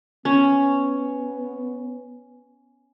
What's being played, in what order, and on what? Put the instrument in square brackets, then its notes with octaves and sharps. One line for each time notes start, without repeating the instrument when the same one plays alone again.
[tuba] B3 [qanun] C#4